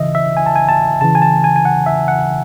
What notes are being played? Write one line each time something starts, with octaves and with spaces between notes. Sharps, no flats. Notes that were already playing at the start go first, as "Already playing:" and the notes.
Already playing: C#3 E3 D#5 E5
E5
G#5
A5
G#5
A5
C#3 E3 A5
G#5
A5
G#5
G#5
F#5
E5
F#5